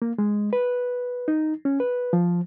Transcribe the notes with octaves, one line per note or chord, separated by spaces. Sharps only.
A#3
G#3
B4
D#4
C#4
B4
F3